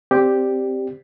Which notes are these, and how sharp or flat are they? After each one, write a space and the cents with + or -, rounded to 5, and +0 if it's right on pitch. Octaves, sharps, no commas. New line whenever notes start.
C4 +0 G4 +0 D5 +0